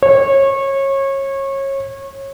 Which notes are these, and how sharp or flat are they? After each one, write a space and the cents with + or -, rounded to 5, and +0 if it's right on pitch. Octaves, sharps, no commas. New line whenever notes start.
C#5 -25